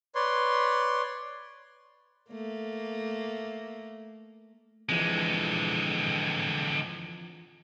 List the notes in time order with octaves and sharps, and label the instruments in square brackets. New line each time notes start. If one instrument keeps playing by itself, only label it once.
[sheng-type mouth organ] B4 C#5 D5 C6
[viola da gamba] A3 A#3
[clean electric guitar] F2 E3 [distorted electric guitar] D3 G#3